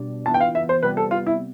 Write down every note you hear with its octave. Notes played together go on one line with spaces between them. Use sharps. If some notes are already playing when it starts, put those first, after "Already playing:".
Already playing: B2 G3 D4
E3 B3 F4 A5
G5
F5
E5
C5
C3 G3 B3 B4
A4
F4
E4